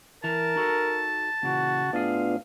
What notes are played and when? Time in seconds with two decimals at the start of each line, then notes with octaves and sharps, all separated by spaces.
0.24 E3 A#4 A5 A#5
0.56 D#4 F#4 A4
1.43 A#2 C#3 E3 F#4
1.93 A2 B3 D4 F4 G#4 F5